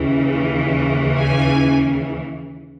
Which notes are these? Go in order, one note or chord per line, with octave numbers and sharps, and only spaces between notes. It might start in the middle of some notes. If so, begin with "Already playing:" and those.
Already playing: D#2 C#3 E3
G#5